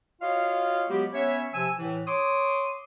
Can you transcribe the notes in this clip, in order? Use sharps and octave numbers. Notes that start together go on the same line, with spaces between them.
F4 F#4 C#5 D#5 F5
F#3 G#3 B3 F#4 G4
B3 C#4 C#5 E5
C3 F3 G#5 E6
A2 E3
C#5 C6 D6 D#6